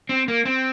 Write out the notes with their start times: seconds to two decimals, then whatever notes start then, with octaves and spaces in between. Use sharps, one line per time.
0.09 C4
0.28 A#3
0.45 C4